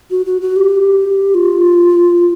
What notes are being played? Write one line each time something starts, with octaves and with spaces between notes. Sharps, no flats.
F#4
F#4
F#4
G4
F4